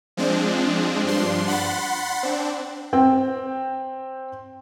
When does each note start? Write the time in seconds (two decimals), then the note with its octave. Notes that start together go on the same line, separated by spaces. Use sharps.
0.17 F3 G#3 C4 D4
1.04 G2 F3 D4 C6
1.48 F#5 B5 C6 A6
2.23 C4 D4
2.93 C4 G5